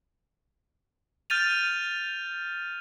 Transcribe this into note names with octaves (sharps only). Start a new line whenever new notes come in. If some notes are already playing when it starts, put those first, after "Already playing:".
F6 G6 A6 D#7 F7